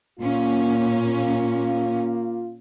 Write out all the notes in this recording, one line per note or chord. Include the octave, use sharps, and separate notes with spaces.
A#2 A#3 C#4 F4